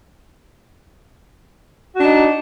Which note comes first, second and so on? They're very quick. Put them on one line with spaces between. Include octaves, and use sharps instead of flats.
F#4 D4 D#4